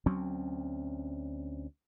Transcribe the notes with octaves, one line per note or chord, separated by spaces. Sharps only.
D2 F#3 C4 C#4